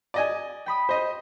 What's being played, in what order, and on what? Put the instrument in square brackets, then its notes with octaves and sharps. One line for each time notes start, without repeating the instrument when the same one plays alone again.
[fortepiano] D5 D#5 G#5
[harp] G5 B5 D#6
[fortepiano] C5 D#5